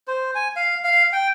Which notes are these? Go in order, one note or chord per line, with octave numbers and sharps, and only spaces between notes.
C5
G#5
F5
F5
G5